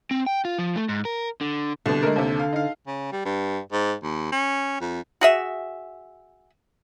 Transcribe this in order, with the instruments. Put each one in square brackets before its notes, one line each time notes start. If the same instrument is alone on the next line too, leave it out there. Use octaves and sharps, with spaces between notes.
[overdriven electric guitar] C4
G5
F4
F3
A3
G#2
A#4
D3
[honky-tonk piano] C2 B2 [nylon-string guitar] D3
[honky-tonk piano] G#3 A3 A#4
D#2 C3
F5
D#4 F5
[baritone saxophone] C#3
G3
G2
G#2
D#2
C#4
F2
[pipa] F#4 G#4 E5